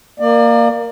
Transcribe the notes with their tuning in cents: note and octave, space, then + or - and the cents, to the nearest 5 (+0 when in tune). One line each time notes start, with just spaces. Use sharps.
A#3 +0 D5 +30